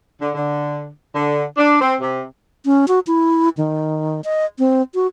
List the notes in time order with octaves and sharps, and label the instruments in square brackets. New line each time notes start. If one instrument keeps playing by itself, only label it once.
[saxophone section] D3
D3
D3
D4
C4
C3
[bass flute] C#4
F#4
E4
D#3
D#5
C4
F#4